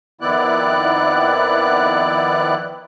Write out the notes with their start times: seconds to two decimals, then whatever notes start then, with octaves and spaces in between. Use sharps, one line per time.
0.21 F2 D#3 B3 E4 D5 F#6